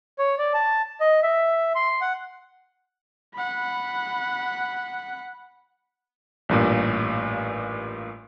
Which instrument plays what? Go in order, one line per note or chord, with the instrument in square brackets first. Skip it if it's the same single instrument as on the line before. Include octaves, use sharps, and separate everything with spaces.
[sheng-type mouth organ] C#5
D5
A5
D#5
E5
C6
F#5
[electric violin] F#5 B5
[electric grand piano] A1 G2 A#2